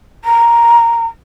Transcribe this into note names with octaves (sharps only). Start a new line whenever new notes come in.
A#5